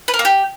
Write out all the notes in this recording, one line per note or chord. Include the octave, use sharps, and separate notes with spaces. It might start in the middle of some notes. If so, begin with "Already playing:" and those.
B4
A#4
A#3
G4